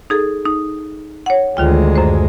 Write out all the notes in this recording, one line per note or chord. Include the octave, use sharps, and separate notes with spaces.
D#4 G#4 A4
D#4
C#5 F#5
D2 D#3 G#3 F4 G5
F#2 C5